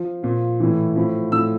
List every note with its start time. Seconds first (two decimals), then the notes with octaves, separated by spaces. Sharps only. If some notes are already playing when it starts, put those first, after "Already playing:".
Already playing: F3
0.23 A#2 F3
0.60 A2 E3
0.96 A2 F3
1.32 A2 F3 E6